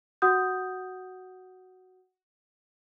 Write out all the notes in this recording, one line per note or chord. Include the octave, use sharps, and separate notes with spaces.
F#4 F#5 D#6 G6